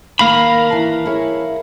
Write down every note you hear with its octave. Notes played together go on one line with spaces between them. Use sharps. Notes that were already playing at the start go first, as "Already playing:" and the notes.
D#3 A#3 A#4 F5 B5
E3 A5
E4 G#4 C#5